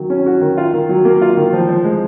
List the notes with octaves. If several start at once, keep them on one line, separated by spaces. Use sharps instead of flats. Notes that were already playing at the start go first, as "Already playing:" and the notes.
Already playing: D#3 F#3
C#4
F#4
D#3
F4
D#3
F#3
A#3
F4
D#3
F3
F3
G#3